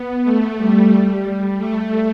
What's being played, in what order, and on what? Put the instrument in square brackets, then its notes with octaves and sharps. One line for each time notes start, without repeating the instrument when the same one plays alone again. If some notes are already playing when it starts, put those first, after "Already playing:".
Already playing: [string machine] B3
A3
G3
A3